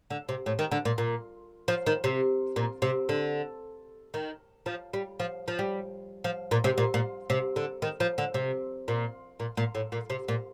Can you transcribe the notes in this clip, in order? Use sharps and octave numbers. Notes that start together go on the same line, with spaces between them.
D3
C3
A2
D#3
D3
A#2
A#2
F3
D#3
C3
A#2
C3
D3
D#3
F3
G3
F3
F3
G3
F3
A#2
C3
A#2
A#2
C3
D3
D#3
F3
D3
C3
A#2
A#2
A#2
A2
A#2
C3
A#2